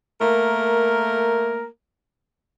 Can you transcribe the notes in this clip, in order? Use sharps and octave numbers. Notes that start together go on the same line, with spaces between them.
A3 A#3 A#4